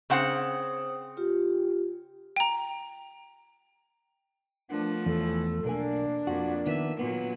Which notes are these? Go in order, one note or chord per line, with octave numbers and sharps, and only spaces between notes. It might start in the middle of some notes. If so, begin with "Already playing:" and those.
C#3 C4 C5 F#5 D#6
F4 G4
G5 A#5
F3 A3 B3 D4 A#4 F#5
B1 E2 E3 A4
B1 A#3 D4 A#4 G#5
F2 A#3 F#4
D#3 B3 E5
A#2 F#3 B3